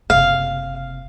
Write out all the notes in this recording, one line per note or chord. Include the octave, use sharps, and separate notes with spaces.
F#1 C3 F5